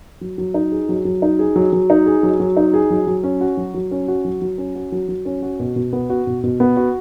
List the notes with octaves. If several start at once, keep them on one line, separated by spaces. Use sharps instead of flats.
F#3
F#3
D#4
G#4
F#3
F#3
D#4
G#4
F#3
F#3
D#4
G#4
F#3
F#3
D#4
G#4
F#3
F#3
C#4
F#4
F#3
F#3
C#4
F#4
F#3
F#3
C#4
F#4
F#3
F#3
C#4
F#4
B2
B2
B3
F#4
B2
B2
B3
F#4